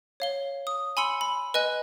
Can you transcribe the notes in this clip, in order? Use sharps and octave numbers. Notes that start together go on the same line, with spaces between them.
C#5 F5 G7
D#6
G#5 B5 C6 E6 C#7 F#7
B5
B4 D#5 G#5 F#6